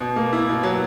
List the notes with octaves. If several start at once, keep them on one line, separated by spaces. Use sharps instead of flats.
B2
A#3
E4
B2
F#3